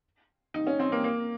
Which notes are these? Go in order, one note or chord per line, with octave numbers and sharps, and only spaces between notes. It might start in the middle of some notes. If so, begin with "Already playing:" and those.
D#4
C#4
C4
A#3
A#3